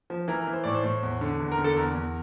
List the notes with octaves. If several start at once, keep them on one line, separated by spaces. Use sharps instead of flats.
F3
E3 A#4
A#4
E3
C5
A2 D5
C5
A2
E2
D3
E2
A#4
D3
A4
E2 A#4
E2